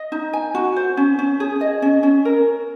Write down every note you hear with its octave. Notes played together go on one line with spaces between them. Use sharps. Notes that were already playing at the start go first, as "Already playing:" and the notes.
Already playing: D#5
D#4
G#5
F#4
C5
C#4
C#4
G#4
D#5
C#4
C#4
A#4